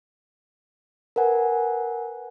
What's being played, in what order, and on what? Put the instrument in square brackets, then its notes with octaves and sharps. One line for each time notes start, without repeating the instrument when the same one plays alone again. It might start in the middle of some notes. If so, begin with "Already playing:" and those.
[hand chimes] A#4 B4 F#5 G#5